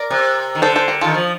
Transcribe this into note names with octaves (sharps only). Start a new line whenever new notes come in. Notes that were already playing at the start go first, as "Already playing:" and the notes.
Already playing: A#4 D5
C3
D#3
D3 A4 C5
A4 C5
G4 A#4
D#3 F4 A4
F3